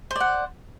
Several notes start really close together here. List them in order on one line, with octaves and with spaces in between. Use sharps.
C5 D5 F#5